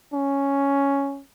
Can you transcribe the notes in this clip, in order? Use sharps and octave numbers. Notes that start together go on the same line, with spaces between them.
C#4